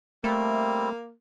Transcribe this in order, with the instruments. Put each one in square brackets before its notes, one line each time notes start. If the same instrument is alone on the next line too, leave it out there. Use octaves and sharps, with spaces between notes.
[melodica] G3 C4 [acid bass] A3 [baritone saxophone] A#3